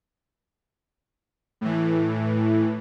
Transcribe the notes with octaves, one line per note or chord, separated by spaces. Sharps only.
A2 E3